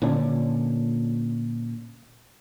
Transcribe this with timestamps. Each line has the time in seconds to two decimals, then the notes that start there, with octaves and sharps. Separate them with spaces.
0.02 A#2 D3 C#4 D4